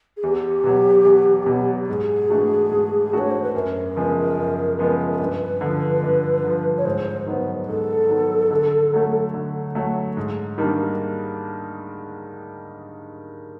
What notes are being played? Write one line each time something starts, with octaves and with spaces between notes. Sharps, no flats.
G#4
E2 G4
B2 F#3
E2
B2 F#3
G#2 G#4
E3 A3 D4 F#4
G#2
E3 A3 D4 F#4 C#5
C5
B4
F#2 A#4
C#3 F3 G#3 B3
F#2
C#3 F3 G#3 B3
A#4
G2 B4
D3 F3
G2
D3 F3
C#5
G#2 C5
D#3 F#3 B3
G#2 A4
D#3 F#3 B3
D3
F#3 A3
D3
F#3 A3
G#2
D#3 G3 A#3 D4